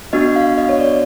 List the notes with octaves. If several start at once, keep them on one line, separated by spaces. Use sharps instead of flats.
B3 D4 F#4 D#5
F5
D#5
C#5
D5